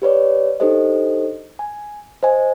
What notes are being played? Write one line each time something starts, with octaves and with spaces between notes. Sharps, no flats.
G4 B4 C#5 D5
D4 D#4 G4 A4 C5 D#5
G#5
C5 D#5 G#5